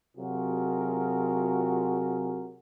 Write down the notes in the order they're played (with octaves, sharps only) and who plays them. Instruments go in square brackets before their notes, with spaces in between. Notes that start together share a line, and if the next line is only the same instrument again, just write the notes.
[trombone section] C3 F#3 F4 F#4 G#4 A#4